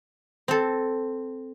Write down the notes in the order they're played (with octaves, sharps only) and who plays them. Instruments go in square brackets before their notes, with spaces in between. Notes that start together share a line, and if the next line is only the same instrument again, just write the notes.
[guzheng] C4 A4